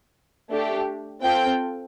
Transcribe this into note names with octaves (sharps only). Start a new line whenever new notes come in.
A3 D4 G4
C4 F4 A4 G5